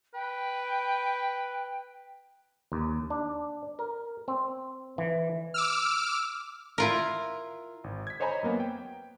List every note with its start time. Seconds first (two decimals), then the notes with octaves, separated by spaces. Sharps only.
0.14 B4 G5
2.72 D#2
3.10 D4
3.79 A#4
4.28 C4
4.98 E3
5.54 D6 E6 F6
6.78 E4 F4 A#4
7.84 G#1
8.07 G#6 B6
8.20 C5 C#5 D#5 G#5 A#5 B5
8.43 F#2 A#3 B3
8.60 G5